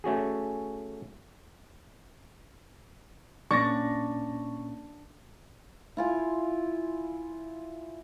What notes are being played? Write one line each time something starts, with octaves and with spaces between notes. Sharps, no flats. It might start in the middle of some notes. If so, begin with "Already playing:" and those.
A3 C#4 F#4 G#4
A#2 A#3 C#4 D4 C#6 A6 A#6
E4 F4 G#5